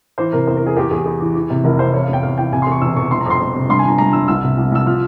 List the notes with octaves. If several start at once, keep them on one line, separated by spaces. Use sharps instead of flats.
E3 C5
C3 A#4
E2 C5
A#4
E3 G#4
E2 G4
E2 G#4
E2
E3
E3
C3
F1 A#4
C3 C5
E2 C#5
F5
E2
G5
E2 F5
E3 G5
C3 G#5
C6
E2 C#6
E1 E6
E2 C#6
G1 C6
A#5
F2 C6
F2
C3
G2 C6
G#5
G1 A#5
G2 A#5
G1 E6
C2 E6
C3
C2
C2 E6
F3 F6